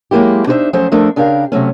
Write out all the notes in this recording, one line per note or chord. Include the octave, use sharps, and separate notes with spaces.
F#3 G#3 A#3 E4 G4
D4 D#4 G#4 B4 C5 E5
F3 F#3 A3 C#4 A4 C5
F3 A3 D4 A4 A#4
C#3 D4 G4 A#4 F5
C3 F#3 A3 C#4